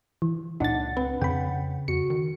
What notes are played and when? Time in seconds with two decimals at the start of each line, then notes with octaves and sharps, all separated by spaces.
0.22 E3
0.60 C#2 A#2 D4 D#4 F#5 A6
0.97 C4 B4
1.22 F2 C#3 G5 B5
1.88 F2 F#4 C#7
2.10 D#3